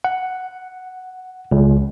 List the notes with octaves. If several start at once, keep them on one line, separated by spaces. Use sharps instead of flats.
F#5
C#2